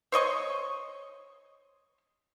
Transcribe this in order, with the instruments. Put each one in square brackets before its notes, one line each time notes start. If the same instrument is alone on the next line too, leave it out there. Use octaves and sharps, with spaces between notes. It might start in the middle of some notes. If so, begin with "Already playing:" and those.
[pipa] C5 C#5 D#5 C#6